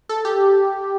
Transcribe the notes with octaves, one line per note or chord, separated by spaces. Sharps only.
A4
G4